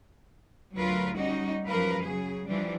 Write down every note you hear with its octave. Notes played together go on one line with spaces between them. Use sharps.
D2 F#3 F4 A#4 B4
G3 C#4 D#4 F#4
F#2 F3 G3 A#4 B4 F5
C#3 F#3 G#4
E3 F3 G3 D4